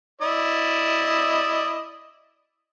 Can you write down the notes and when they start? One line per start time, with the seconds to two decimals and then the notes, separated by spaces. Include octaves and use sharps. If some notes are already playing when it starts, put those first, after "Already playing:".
0.22 E4 D5 D#5